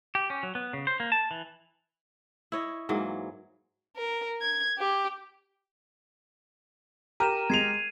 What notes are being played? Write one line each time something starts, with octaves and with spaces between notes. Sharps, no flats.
G4
C#4
F#3
B3
C#3
C5
A#3
A5
E3
E4 C#5 D#5
G#2 E3 F#3 A#3
A#4
G#6
G4
G4 A#4 A#5 D#7 E7
G#3 G#6 C7 D#7 F7